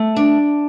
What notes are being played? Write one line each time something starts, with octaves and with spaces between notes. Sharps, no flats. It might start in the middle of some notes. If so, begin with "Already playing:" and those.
Already playing: A3
D4